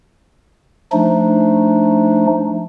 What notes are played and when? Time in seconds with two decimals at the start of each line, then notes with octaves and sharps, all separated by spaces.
0.92 F3 A3 D4 D#4